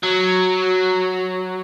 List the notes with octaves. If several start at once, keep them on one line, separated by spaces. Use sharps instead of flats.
F#3